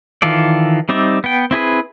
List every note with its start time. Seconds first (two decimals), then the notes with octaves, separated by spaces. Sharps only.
0.22 D#3 E3 F4 A4 D5
0.89 G3 C4 D#4 D5 E5
1.24 B3 G5
1.51 C4 E4 G#4 B4